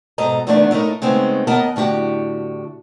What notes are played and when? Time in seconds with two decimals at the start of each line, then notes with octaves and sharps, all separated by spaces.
0.18 G#2 B2 A4 D#5 A#5
0.47 E2 D3 D#3 A3 B3 D4
0.71 A2 A3 D#4 A#4
1.02 C#3 G#3 A3 B3 C4 D#4
1.47 D#2 B3 A#4 D#5 A5
1.76 A2 D3 F#4 G4